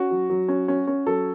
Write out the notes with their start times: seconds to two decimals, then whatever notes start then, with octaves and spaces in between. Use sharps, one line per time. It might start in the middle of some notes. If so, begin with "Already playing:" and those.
Already playing: C#4 F#4
0.11 F#3
0.30 F#3
0.48 C#4
0.68 C#4
0.87 C#4
1.07 F#3 A4